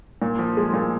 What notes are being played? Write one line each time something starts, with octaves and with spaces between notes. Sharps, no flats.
A#2
F3
G#3
A#2